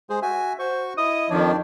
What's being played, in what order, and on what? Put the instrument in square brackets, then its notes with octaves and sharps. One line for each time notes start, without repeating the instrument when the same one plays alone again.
[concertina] G#3 G#4 C5
[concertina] F#4 G#5 [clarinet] E5
[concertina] F#4 C#6 [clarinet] C5
[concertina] E4 D#5 [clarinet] D#6
[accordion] F2 D#3 F3 [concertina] D4 D5 [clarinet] C#5